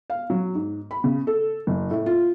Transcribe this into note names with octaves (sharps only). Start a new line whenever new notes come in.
F5
F#3
G#2
B5
C#3
A4
F#1
A2
F4